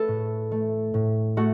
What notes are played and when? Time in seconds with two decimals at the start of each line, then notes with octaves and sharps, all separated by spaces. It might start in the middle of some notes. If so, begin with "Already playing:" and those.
Already playing: A3 A4 B4
0.08 A2
0.52 A3
0.94 A2
1.37 A3 F#4